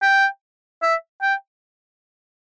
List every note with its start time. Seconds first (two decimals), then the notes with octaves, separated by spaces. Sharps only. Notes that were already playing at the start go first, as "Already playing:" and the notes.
0.02 G5
0.82 E5
1.22 G5